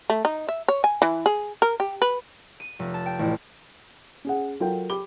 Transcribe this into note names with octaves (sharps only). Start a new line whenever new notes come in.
A3
D#4
E5
C#5
G#5
E3
G#4
A#4
G4
B4
D#7
F1
A5
G5
A1
C#4 G#4 F#5
F#3 F4 A4 A#4 G5
G4 B5 D6 G7